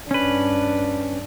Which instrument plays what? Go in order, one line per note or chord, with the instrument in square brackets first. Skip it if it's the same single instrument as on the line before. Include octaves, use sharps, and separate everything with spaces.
[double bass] G2 D4 [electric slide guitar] C#4 B4